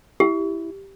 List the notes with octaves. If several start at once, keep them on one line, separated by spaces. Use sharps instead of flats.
E4 G4